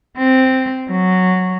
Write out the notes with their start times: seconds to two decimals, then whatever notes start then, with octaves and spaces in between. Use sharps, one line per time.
0.18 C4
0.91 F#3